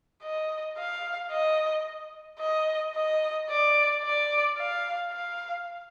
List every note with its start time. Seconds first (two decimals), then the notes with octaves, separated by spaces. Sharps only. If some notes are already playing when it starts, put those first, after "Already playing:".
0.23 D#5
0.77 F5
1.31 D#5
2.40 D#5
2.95 D#5
3.50 D5
4.03 D5
4.57 F5
5.13 F5